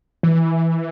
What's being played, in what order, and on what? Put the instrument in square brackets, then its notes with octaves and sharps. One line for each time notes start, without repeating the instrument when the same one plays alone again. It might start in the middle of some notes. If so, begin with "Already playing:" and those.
[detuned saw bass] E3